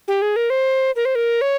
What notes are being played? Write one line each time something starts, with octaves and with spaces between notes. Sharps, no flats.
G4
G#4
A#4
C5
A#4
C5
A#4
C#5